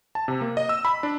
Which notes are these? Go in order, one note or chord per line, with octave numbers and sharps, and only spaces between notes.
A5
C3
A#3
D#5
E6
B5
D4